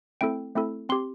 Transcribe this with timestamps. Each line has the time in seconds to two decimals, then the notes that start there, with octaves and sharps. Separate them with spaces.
0.21 A3 C4 E4 A4 G5
0.55 A3 C4 E4 A4
0.89 C4 G4 C6